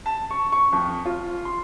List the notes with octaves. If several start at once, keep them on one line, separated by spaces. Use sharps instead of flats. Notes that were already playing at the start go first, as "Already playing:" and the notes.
A5
C#6
C#6
F2
F4
C6